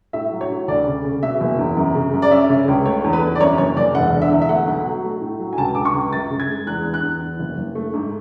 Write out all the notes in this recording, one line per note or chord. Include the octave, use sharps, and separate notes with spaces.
A2 E5
F#3
C#5
A2
D2 D5
C#3
C#3
B2 E5
F#1
E2
F#2
C#3
F#2
D5
C#4 E5
C#3
C#2
A3 C#5
E2
B4
E2
D5
F#2 C#5
F#1 C#5
F#1 D5
E1 F#5
D3
E5
E2
E5
A3 F#5
B1
F#3
A3
A2
F#3
G#5
C#2 A5
C#2 D6
C#6
C#2
F#2 A6
C#3
G#6
G#3
E2 F#6
E2
F#6
E2
E2
F#1
F#1
A3
G#2